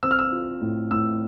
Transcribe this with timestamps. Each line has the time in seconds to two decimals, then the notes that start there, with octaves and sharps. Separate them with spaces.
0.03 C4 E6
0.11 F6
0.19 E6
0.32 F4
0.62 A2
0.91 A2 E6